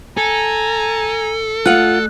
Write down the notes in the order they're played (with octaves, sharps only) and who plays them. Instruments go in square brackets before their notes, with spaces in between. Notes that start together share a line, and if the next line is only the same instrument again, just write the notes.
[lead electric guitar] A4 [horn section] G#5 A#5
[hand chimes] A3 F#6 [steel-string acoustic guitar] F4 F#5